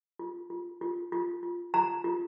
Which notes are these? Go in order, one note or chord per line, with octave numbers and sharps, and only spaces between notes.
F4
F4
F4
F4
F4
F4 A#5
F4